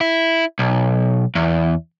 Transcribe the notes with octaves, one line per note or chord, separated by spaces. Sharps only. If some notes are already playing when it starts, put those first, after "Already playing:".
E4
B1
E2